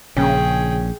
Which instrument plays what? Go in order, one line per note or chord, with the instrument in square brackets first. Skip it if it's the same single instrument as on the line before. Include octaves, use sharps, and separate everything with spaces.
[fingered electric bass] A#1 [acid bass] C#3 [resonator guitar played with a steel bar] C#4 [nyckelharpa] G#4 G5